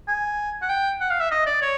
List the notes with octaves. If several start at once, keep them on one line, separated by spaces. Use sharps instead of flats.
G#5
F#5
G5
F#5
F5
E5
D#5
D5
C#5